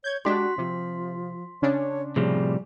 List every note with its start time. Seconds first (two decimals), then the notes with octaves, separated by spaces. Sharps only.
0.04 C#5 G6 G#6
0.25 G#3 D4 F#4 G4 C6 B6
0.58 C3 F3
1.62 C#3 C#4 D4 C#5
2.16 A2 C3 F3 G3 G#4